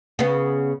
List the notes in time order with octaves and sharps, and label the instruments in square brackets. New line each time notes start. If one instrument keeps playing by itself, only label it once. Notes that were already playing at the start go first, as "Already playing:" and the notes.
[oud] C#3 B3